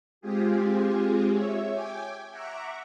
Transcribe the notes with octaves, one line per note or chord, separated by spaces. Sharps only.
G#3 C4 F4 G4 G#4
C#5 E5
G5 G#5 D6
E5 F#5 A#5 C#6 D6